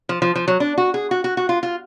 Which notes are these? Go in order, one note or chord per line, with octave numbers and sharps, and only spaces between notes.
F3
F3
F3
F#3
D4
F#4
G#4
F#4
F#4
F#4
F4
F4